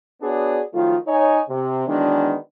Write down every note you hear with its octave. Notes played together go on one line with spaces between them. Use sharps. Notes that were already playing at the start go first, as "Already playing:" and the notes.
B3 D4 F#4 G#4 C#5 D5
D#3 F3 F#3 A3 F4
D#4 C#5 D#5 G#5
C3
D#3 E3 F#3 G#3 B3 D4